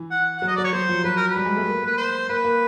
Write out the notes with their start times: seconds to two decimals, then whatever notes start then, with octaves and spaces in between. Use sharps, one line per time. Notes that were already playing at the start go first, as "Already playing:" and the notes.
Already playing: E3
0.11 F#5
0.38 F#3 F#5
0.48 D#5
0.56 F#3 D5
0.65 C#5
0.73 F#3 C5
0.89 F3
1.04 F#3 B4
1.17 A#4
1.28 B4
1.36 G3
1.46 G#3
1.56 A3
1.67 A#3
1.83 A#3 B4
1.98 C5
2.29 A#3 B4
2.44 A#3